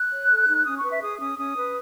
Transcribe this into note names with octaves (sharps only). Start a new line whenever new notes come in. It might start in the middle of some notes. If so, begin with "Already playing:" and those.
Already playing: F#6
C#5
A4
D#4
C#4 D#6
C#6
B4
E5
G#4 D#6
C#4 D#6
C#4 D#6
B4